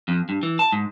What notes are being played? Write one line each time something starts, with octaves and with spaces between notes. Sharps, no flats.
F2
G2
E3
A5
G#2